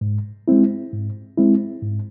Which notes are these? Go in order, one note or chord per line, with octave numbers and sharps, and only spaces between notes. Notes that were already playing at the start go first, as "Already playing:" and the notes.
G#2
G#3 C4 E4
G#2
G#3 C4 E4
G#2